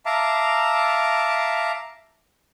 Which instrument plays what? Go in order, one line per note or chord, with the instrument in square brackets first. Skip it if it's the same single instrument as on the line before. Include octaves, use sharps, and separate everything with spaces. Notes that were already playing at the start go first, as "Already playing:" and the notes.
[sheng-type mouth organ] E5 F5 A5 A#5 D6